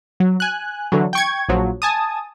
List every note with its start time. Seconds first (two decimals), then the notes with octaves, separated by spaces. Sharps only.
0.20 F#3
0.40 G#5 F#6
0.92 D3 E3 F#3
1.13 G5 C#6 G#6
1.49 A#1 F3 F#3
1.82 G#5 A5 D#6